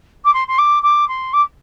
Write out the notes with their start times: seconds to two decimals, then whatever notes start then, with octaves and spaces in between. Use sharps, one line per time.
0.25 D6
0.33 C6
0.48 C6
0.58 D6
0.83 D6
1.08 C6
1.33 D6